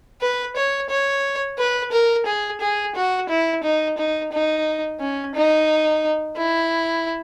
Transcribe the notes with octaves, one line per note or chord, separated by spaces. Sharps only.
B4
C#5
C#5
B4
A#4
G#4
G#4
F#4
E4
D#4
D#4
D#4
C#4
D#4
E4